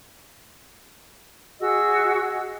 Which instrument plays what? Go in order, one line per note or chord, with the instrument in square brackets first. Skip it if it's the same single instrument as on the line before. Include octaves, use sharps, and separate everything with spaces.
[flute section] F#4 G#4 D#5 E6